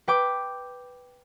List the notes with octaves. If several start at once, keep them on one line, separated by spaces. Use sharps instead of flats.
B4 G5 D6